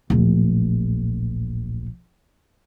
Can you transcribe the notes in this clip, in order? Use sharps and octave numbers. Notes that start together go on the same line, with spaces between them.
D1 A#1